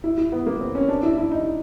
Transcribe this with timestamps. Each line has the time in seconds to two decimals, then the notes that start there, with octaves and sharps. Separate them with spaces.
0.04 E4
0.18 E4
0.32 B3
0.46 A#3
0.61 C4
0.75 C#4
0.88 D4
1.03 E4
1.17 E4
1.31 D#4